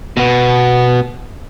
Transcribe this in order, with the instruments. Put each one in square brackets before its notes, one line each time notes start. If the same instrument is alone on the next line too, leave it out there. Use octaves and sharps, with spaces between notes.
[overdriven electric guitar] B2 B3